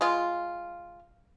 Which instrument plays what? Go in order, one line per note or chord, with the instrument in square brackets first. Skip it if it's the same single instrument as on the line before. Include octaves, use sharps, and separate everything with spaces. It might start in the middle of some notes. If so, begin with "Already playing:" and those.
[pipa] G#3 F4